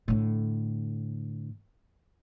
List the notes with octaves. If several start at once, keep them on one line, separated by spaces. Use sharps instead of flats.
A2 D3